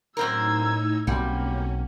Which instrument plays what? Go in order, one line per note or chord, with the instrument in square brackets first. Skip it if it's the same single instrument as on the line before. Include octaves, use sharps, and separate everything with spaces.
[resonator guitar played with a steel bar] F#2 C4 A#4 [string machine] A2 D#4 [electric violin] E6 G#6
[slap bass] B1 B2 C4 [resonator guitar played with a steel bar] G3 [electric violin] A#3 [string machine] C#4